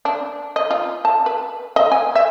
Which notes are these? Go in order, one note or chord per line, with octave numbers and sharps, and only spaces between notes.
D4
D#5
F4
A5
B4
D#5
G#5
E5